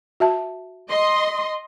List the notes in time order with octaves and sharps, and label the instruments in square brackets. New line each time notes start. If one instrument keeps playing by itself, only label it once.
[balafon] F#4 E5 A5
[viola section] D#5 C6